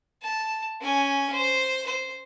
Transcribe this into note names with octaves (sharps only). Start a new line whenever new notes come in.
A5
C#4 G#5
C5
C5